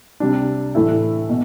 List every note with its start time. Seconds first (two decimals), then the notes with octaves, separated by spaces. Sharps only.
0.20 C3 G3 D4
0.75 A2 E3 A3 E4
1.29 B2